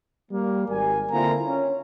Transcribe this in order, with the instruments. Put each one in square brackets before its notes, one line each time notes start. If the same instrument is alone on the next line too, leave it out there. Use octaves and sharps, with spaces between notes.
[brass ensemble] G3 A#3
G#1 G3 A#4 G#5
D3 A#3 C4 E4 F4 A#5
C#4